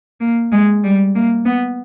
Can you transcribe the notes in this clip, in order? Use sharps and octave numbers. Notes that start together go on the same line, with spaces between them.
A#3
G#3
G3
A#3
B3